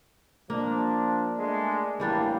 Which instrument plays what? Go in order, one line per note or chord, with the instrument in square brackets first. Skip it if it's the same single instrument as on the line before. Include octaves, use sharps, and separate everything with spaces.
[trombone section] F3 D4 [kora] A#3
[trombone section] G#3 A3 D4
[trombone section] A1 G2 A#3 [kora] E3 G3 D4